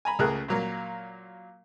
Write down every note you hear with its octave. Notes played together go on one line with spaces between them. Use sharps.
G#5 A#5 B5
C#2 C#3 A3 G#4 A#4 F#6
A#2 F#3 A#3